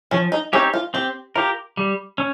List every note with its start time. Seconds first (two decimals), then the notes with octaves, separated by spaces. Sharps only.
0.11 F3 C#4
0.32 D#4
0.53 C4 C#4 D#4 G4 C#5
0.74 F4
0.94 C4 G4
1.36 F4 G4 A#4
1.77 G3
2.18 C#4